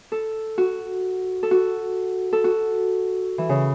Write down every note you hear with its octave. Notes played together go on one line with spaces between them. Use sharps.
A4
F#4
A4
F#4
A4
F#4
E3
C#3